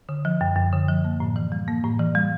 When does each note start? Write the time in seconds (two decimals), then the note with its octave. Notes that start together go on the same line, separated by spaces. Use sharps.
0.09 D3
0.25 F3
0.41 F#2
0.56 F#2
0.73 D3
0.88 F3
1.05 A#3
1.20 A2
1.36 E3
1.52 G3
1.68 A#3
1.83 A2
1.99 E3
2.15 G3